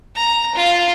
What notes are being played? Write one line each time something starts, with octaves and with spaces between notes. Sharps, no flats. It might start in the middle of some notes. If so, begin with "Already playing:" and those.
A#5
F4